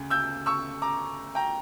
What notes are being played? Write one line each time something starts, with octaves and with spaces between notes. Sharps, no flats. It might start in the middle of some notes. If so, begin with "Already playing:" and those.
Already playing: D2 C#3
E6 G6
C#6 E6
A#5 D6
G5 A#5